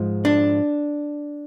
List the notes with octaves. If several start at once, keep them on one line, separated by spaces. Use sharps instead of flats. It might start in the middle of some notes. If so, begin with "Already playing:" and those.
Already playing: G#2 F3 G#3
D4